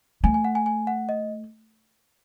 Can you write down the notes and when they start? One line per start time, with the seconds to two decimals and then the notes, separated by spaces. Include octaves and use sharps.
0.24 A3 G#5
0.34 G#5
0.45 F#5
0.55 G#5
0.66 G#5
0.87 F#5
1.09 D#5